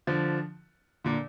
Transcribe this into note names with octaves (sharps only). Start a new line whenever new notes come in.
D3 F3
A#2 D3